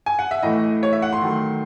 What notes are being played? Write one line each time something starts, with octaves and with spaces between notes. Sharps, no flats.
G#5
F#5
E5
A2 E3 A3 D#5
C#5
E5
F#5
C6
D#3 F#3 A3